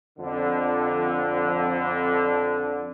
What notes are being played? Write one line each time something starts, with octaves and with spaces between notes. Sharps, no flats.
F2 D3